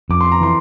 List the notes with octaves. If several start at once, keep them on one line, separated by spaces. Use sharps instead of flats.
F2 D6
C6
A#5
E3 C6